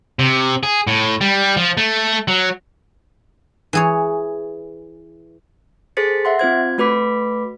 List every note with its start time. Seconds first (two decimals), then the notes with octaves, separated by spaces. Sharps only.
0.19 C3
0.63 G#4
0.87 A2
1.21 G3
1.57 F3
1.77 A3
2.28 F#3
3.73 E3 G#4 C#5
5.97 G#4 A4 C5 A6 B6 C#7
6.25 E5 F#5 C6
6.39 C4 F4 C5 G#6
6.78 A3 F#4 B4 B5 D6 B6